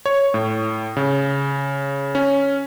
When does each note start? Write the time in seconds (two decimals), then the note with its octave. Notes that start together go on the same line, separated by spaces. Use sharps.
0.06 C#5
0.34 A2
0.97 C#3
2.15 C#4